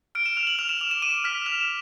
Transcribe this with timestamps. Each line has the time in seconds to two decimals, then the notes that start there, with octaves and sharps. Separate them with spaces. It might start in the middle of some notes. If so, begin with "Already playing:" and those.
0.15 F6 D7
0.26 E7
0.37 F6 F7
0.47 F#7
0.59 F6 F7
0.69 E7
0.81 D6 F7
0.91 E7
1.02 D6 D#7
1.24 F6 B6
1.46 F6 F7
1.61 E7